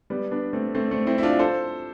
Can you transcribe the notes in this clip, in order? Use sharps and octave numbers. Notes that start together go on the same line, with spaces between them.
G3 B3
B3 D4
A3 C4
A3 C4
A3 C4
C4 E4
E4
D4 F4
A4 C5